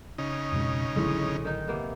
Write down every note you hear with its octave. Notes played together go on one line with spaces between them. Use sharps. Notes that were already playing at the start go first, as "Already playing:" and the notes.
C#3 D#4
F2 B2 G#3
A#1 A2 D3 F#3 G#3
D#3 D#4
C3 A#3 B3